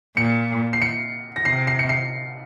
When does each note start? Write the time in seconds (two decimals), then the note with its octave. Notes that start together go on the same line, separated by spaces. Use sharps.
0.17 A#2 C#7
0.73 C7
0.82 C#7
1.36 A#6
1.45 C3 C7
1.67 C7
1.79 C#7
1.89 C7